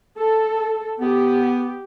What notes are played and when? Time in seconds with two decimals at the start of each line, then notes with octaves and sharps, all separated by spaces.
0.17 A4
1.00 B3 G4